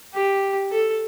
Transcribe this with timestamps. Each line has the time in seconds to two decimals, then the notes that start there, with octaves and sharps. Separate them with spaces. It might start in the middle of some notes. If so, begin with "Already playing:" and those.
0.14 G4
0.72 A4